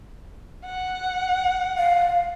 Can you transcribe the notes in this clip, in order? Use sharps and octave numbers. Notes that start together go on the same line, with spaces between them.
F#5
F5